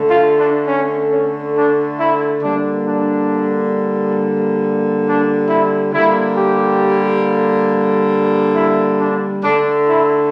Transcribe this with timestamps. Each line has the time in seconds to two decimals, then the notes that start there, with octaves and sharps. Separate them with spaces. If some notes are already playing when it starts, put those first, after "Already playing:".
Already playing: D3 A3
0.09 F4
0.38 D4
0.67 C#4
1.11 C#4
1.55 D4
1.99 E4
2.43 D3 G3 A#3 D4
2.86 D4
5.05 D4
5.49 E4
5.94 D3 G3 A#3 E4
6.37 G4
8.56 E4
9.00 D4
9.43 D3 A3 D4
9.88 E4